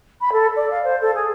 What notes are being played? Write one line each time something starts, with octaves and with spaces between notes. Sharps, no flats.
B5
A4
D5
F5
C5
A4
G#4